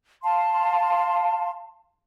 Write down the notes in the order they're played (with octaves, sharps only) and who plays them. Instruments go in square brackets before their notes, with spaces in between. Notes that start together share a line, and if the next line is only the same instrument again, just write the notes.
[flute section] F5 A5 C6